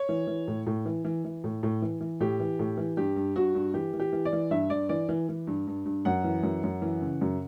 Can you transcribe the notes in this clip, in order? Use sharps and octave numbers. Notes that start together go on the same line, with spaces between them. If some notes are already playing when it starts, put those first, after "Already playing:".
Already playing: C#5
E3
E3
A2
A2
E3
E3
E3
A2
A2
E3
E3
A2 G4
E3
A2
E3
G2 G4
G2
G2 F#4
G2
E3 G4
E3
G4
E3
D5
E3
G2 E5
G2 D5
E3 D5
E3
E3
G2
G2
G2
F#2 F#5
E3
F#2
F#2
E3
C#3
F#2